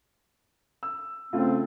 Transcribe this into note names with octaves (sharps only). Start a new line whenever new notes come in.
E6
C#3 A3 C4 F4